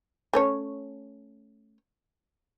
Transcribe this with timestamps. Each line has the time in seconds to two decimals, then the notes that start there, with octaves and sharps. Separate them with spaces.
0.33 A3 C#4 C#5